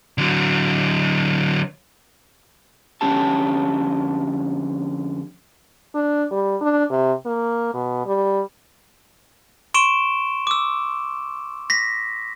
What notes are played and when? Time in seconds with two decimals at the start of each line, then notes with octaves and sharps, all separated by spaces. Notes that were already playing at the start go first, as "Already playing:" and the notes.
0.18 D3 F#3
3.01 F2 D3 F#3 C#4 G4 A5
5.95 D4
6.31 G3
6.61 D4
6.89 C3
7.26 A#3
7.74 B2
8.06 G3
9.74 C6 C#6 D7 E7 G7
10.47 D6 E6
11.70 A#6 B6